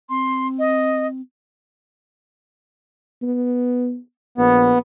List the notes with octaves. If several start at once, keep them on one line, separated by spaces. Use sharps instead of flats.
C4 C6
D#5
B3
A#1 B3